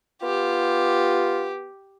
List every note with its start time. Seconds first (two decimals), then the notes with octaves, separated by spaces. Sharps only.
0.22 B3 F4 G4